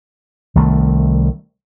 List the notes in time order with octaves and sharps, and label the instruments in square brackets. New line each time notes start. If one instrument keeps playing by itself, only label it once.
[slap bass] C2 D#3 A3